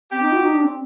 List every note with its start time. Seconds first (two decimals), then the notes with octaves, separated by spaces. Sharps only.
0.11 C4 G4
0.22 D#4
0.32 F#4
0.42 D#4
0.53 D4
0.63 C4